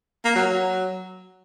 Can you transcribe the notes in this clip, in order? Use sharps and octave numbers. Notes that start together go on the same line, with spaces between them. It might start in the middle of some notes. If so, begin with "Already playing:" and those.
A#3
F#3
F#3